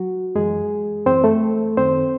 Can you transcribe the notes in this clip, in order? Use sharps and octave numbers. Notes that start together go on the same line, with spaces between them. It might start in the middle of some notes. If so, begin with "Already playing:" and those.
Already playing: F#3 F#4
F#2 E3 G#3 G#4
F#2 E3 C4 C5
A3 A4
F#2 D#3 C4 C5